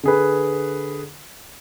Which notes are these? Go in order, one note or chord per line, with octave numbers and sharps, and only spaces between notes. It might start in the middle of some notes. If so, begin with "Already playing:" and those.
D3 G#4 B4